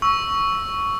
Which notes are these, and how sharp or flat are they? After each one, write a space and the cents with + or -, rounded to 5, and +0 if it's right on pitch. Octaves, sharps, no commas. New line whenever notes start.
C#6 +10 E6 +0